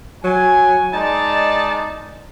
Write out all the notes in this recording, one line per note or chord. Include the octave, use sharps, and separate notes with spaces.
F#3 G#5
G#3 D#4 D5 A5